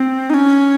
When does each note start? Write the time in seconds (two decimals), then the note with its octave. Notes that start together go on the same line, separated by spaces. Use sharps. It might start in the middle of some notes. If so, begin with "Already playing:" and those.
Already playing: C4
0.30 D#4
0.34 C#4